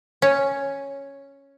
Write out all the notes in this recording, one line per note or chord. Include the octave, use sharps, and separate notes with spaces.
C#4